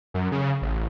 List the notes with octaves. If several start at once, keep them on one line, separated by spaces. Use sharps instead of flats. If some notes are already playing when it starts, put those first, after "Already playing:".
F#2
C#3
A1